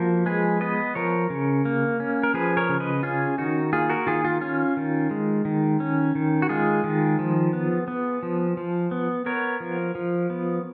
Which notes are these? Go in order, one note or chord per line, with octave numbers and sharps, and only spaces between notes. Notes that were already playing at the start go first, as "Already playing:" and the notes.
Already playing: F3 A#3 F#4 A#4
G#3 G#4 B4
B3 B4 D#5
F3 A#4 C#5
C#3
A#3
C#4
A#4
F3 G#4 B4
A#4 C#5
C#3
B4 D#5
C#4 F4 G#4
D#3 D#4 F#4
A#3 F4 G#4
F#4 A#4
D#3 F4 G#4
F4
C#4 F4
D#3
G#3
D#3
C#4
D#3
F#4
G#3 F4 G#4
D#3
F3
B3
B3
F3
F3
B3
B3 A#4 C#5
F3
F3
B3